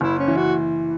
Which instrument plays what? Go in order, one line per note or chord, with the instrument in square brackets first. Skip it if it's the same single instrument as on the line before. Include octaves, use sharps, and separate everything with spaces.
[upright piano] F#1 [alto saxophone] E4
[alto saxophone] C#4
[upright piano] E3
[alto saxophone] F#4